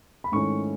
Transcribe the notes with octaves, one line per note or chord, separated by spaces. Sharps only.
B5
G#2 D#3 A3 C#4 E4 C#6